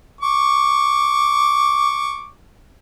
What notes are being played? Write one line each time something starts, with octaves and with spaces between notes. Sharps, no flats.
C#6 D6